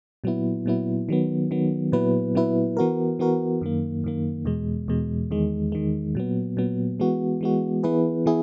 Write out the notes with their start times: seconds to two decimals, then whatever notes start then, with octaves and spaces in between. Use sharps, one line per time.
0.24 A#2 F#3 B3 E4
0.66 A#2 F#3 B3 E4
1.09 D#3 F#3 B3
1.51 D#3 F#3 B3
1.92 A#2 F#3 B3 E4 B4
2.35 A#2 F#3 B3 E4 B4
2.77 E3 B3 F#4 A#4
3.19 E3 B3 F#4 A#4
3.61 F#2 D#3 A#3
4.04 F#2 D#3 A#3
4.45 E2 B2 G#3
4.88 E2 B2 G#3
5.31 E2 D#3 G#3
5.72 E2 D#3 G#3
6.15 A#2 F#3 B3
6.57 A#2 F#3 B3
7.00 E3 G#3 B3 F#4
7.41 E3 G#3 B3 F#4
7.83 E3 B3 E4 G#4 B4
8.26 E3 B3 E4 G#4